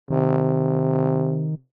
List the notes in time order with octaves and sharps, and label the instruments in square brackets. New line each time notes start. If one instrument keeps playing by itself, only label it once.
[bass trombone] C3 [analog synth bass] D#3